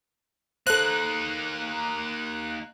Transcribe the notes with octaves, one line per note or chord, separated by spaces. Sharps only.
A#3 D#4 A4 C5 F#6